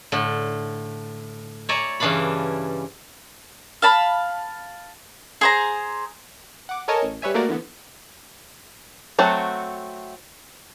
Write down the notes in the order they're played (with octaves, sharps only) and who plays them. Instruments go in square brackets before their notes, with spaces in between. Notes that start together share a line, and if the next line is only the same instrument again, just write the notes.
[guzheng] A2 D3
C#5 D5 E5 G#5 A#5
G2 C#3 E3 D4 F5 B5
[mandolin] F5 A5 B5
G#4 C5 A#5
[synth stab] F#5 D6
A4 A#4 C#5 D#5 G#5 A5
A1
G3 B4 C#5 E5 G#5
A3 A#3 F#4 A#4 D5
D3 E3 B3
[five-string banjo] F#3 A3 C4 F#4